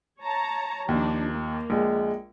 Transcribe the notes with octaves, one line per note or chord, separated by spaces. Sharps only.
C#5 A5 A#5
D#2 F3 D4 D#4
A#3
A#1 G#3